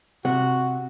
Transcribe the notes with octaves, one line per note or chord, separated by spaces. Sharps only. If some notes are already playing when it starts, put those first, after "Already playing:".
C3 F#4 F#5